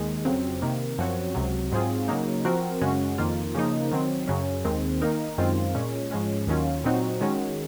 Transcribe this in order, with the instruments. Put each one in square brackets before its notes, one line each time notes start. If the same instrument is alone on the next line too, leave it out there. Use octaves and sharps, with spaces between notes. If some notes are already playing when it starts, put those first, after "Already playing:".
Already playing: [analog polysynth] D#2 D#3 G#3
F2 C#3 F#3 C4
C3 D#3 A#3
F#2 F3 C4 F#4 C#5
C#2 C3 F#3
G#2 F#3 C4 F4 G#4
C#3 F#3 A#3 D#4
F3 C4 F#4 A#4
F#2 C#3 G#3 C#4 F#4
F2 D#3 A#3 F4
C#3 F3 A#3 D#4
D#3 F#3 C4
F#2 C#3 F#3 C#4
D#2 D#3 G#3 C4
D#3 A#3 D#4 A#4
F#2 D#3 G#3 C4 F4
A#2 G#3 C#4
G#2 F3 G#3 C#4
D#2 D#3 F#3 C#4 F4
A#2 F#3 C4 D#4 F#4
D#3 G#3 C#4 F#4